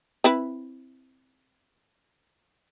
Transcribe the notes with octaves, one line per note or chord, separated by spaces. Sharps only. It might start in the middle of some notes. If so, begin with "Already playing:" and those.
C4 E4 B4